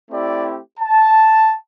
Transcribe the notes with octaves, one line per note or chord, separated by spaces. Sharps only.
A3 C4 E4 G4 D5
A5